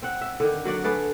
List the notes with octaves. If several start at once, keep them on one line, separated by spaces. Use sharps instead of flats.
C4 F#5
E5
D3 D#3
F#3 F#4 D5 F#5
A3 G#4 B4 D5